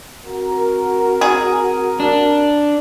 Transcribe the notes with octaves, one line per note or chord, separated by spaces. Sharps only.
C4 F#4 A#4
G#4
D4